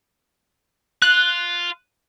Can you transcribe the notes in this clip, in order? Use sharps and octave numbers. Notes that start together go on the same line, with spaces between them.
F4 F#6